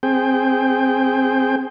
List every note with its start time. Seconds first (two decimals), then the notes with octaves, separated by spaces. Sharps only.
0.03 C4 G#4 G5